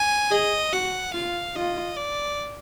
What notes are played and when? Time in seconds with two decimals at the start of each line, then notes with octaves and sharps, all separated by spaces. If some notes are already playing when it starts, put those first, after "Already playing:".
Already playing: G#5
0.31 G#4 D#5
0.73 F#4 F#5
1.14 F4 F5
1.55 F4 D#5
1.97 D5